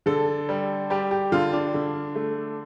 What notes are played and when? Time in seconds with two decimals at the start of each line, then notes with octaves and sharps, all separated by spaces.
0.06 D3 A4
0.49 G3
0.90 G3 G4
1.11 G4
1.32 D3 F4
1.53 D4
1.74 D3
2.15 A3